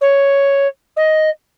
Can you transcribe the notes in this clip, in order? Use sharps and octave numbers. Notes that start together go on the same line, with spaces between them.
C#5
D#5